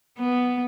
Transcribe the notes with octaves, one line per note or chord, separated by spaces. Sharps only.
B3